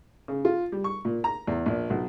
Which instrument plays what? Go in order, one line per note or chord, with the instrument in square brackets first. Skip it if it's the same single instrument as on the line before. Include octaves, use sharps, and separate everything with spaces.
[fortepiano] C#3
F4
G3
C#6
A#2
A#5
E2
A#1
B1